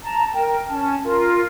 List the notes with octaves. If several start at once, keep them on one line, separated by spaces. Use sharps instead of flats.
A5 A#5
A#4 G5
C#4 A5
F4 A#4